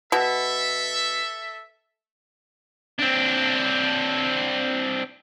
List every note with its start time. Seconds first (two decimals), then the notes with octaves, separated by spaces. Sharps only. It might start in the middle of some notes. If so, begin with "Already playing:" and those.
0.12 B2 A4 E5
2.99 C4 D4